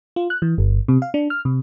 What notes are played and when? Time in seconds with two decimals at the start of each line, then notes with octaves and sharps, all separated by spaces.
0.16 F4
0.30 F#6
0.42 E3
0.58 G1
0.88 C3
1.02 F5
1.14 D4
1.30 F6
1.45 C3